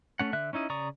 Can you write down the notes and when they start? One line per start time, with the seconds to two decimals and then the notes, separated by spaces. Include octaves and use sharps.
0.19 A3 C#4 F#5
0.33 D3 E5 F#6
0.53 C#4 D#4 E4 D#5
0.70 C#3 D5 A#5 C#6 D#6